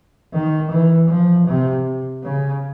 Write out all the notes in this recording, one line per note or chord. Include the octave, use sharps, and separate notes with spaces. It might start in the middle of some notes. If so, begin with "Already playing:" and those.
D#3
E3
F3
C3
C#3